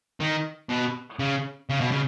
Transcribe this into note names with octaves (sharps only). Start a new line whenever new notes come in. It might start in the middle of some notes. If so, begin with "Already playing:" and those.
D#3
B2
C#3
C#3
B2
C#3